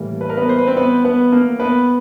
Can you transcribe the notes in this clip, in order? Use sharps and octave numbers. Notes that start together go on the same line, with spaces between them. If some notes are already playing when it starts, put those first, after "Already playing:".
Already playing: A2 E3 G3 A#3
B4
A#4
B3 B4
C5
B4
C4 C5
B3 B4
B3 B4
A#3 A#4
B3 B4